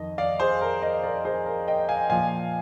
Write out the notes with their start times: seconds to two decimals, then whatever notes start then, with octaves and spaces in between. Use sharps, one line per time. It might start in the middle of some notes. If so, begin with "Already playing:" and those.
Already playing: F2 D#3 D#5
0.18 D5 F5
0.40 G#4 C5
0.61 A#4
0.83 C5 D#5
1.03 A#4 D5
1.25 G#4 C5
1.46 A#4
1.68 D#5 G5
1.89 F5 G#5
2.10 A#2 F3 F5 G#5